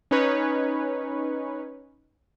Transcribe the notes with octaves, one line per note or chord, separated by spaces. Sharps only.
C#4 D#4 B4 C#5